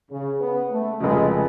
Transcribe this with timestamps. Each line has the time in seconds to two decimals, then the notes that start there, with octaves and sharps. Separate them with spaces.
0.11 C#3
0.40 B3
0.70 A3
1.00 F1 F2 C#3 G#3